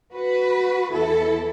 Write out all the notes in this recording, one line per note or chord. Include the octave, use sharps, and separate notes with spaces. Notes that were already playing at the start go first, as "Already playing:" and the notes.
F#4 B4
E2 E3 E4 A4